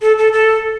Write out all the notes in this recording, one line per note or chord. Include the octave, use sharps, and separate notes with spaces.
A4
A4
A4